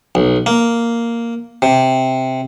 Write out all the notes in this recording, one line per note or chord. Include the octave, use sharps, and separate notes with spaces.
B1
A#3
C3